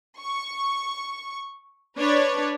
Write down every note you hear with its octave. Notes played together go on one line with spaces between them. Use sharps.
C#6
D4 B4 C#5